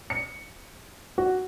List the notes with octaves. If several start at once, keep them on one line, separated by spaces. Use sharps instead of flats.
C#7
F#4